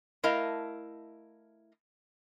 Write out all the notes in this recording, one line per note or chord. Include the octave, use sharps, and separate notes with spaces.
A3 E4 A#4 D#5 F5 A5